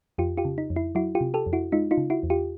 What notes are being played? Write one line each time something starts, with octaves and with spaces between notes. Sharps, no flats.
F2 F4 G4
F4 G4
C#3
D#4
F2
E4
F#3 E4 F#4
F4 G4
C3
G4 A4
F2
E4 F#4
G#3 D#4 F4
D#4 F4
C#3
E4 F#4
E2
F4 G4